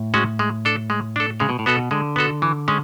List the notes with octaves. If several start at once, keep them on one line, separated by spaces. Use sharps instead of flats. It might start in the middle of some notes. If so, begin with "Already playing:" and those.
Already playing: A2
G#3 C#4 F#4
G#3
D4 A4
G#3
D4 A4
C#3 G#3
B2
A2
B2 B3 F#4 A4
D3 G#3
B3 F#4 A4
E3
G#3 C#4